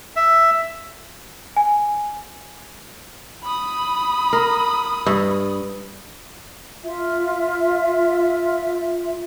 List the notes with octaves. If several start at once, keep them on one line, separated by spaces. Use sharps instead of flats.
E5
G#5
B5 D#6
A#4
G2
F4 E5